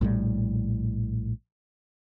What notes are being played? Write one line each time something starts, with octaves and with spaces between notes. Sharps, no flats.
A#1 A2 D#3 G3